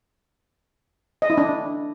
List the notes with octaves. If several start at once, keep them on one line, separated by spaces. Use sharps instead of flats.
D#5
E4
D4